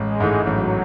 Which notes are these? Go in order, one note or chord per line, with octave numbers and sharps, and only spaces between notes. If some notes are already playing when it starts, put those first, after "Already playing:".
Already playing: A1 G#3
G#2 E3 A3
A1 F#3